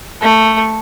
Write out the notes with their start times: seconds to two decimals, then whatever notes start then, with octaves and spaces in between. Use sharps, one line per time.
0.22 A3